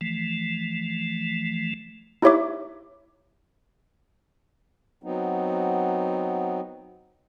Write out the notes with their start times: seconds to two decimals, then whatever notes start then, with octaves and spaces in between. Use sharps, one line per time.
0.01 E3 F3 A3
2.22 D#4 E4 G4 C#5 E5 D6
5.03 F#3 B3 C4 D#4